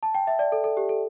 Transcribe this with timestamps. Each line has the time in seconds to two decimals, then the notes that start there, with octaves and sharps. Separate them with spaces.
0.03 A5
0.15 G5
0.27 E5
0.39 D5
0.52 A4
0.64 A4
0.77 G4
0.89 A4